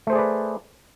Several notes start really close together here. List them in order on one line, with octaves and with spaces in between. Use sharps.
A3 C5 G#4 D5 B4